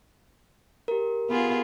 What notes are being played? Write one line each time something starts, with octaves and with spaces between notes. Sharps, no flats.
G4 A#4
B3 F4 G#4